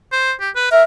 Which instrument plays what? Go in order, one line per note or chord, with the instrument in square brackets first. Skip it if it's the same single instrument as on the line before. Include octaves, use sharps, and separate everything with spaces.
[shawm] C5
G4
B4
[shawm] A#4 [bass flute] E5